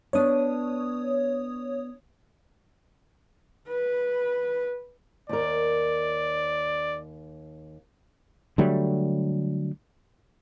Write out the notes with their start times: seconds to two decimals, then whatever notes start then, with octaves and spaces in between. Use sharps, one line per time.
0.13 B3 D4 C#5 D#6
3.68 B4
5.29 D#2 A#4 D5
8.58 D3 F#3 G3 A3